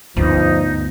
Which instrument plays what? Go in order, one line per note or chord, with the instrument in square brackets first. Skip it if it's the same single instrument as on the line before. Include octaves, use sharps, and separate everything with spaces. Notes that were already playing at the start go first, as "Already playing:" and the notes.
[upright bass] D2 B3 [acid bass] G2 [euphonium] F3 [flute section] D#4